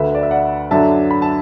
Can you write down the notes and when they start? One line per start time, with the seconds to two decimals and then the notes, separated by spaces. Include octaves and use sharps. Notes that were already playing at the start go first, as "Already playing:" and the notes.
Already playing: D2 D3 A3 B4 E5
0.15 D5
0.23 E5
0.31 D5 F#5
0.71 F#2 D3 F#3 D4 E5 A5
1.11 B5
1.22 A5